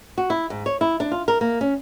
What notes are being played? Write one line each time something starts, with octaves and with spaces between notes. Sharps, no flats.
F#4
E4
G#2
C#5
E4
D4
F4
A#4
A#3
C#4